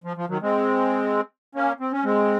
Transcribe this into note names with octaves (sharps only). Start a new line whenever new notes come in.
F3
F3
D#3 F#3
G#3 C4
A#3 C#4
C4
C#4
G#3 C4